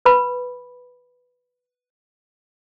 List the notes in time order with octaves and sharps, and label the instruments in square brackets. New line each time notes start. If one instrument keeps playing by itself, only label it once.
[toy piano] B4 B5